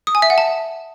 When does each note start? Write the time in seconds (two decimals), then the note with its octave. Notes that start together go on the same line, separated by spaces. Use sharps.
0.07 D#6
0.15 G#5
0.22 E5
0.30 F#5
0.38 A5